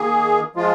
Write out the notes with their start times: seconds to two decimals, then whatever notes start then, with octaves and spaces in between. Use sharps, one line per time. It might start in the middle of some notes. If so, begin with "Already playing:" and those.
Already playing: D#3 A#3 G#4
0.55 F3 G#3 F4